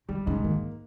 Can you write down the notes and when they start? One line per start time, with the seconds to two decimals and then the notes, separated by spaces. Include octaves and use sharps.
0.09 D#3 G3
0.26 G#2 C#3
0.44 D#3 A#3